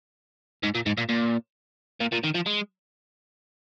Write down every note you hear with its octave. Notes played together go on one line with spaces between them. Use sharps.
G#2
A#2
G#2
A#2
A#2
A#2
A#2
D#3
F3
G#3